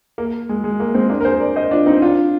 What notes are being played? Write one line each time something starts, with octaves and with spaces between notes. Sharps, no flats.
A#3
G#3
G#3
A#3
G#3 C4
A#3 D4
A#4
G#4 C5
A#4 D5
C5 D#5
D4 F4
C4 D#4
D4 F4